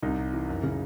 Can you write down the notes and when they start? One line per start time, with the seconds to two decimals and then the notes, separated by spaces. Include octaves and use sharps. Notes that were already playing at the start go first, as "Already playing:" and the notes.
0.03 C2 D#4
0.17 C3
0.33 E3
0.49 F#2
0.63 C#3